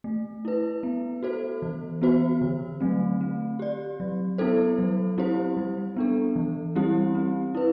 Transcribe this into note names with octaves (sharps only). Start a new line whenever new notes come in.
A3
E4 B4
B3
F#4 A4 C5
E3
B3 F#4 C5
D3
F#3 A3 C4
C4
G4 D5
F#3
B3 E4 A4 C5
F#3
C4 E4 G4 C5
G3
B3 D4 A4
E3
G3 C4 E4 G4
C4
E4 B4